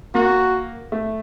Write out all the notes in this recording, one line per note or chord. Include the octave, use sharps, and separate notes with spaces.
A#3 F#4
A3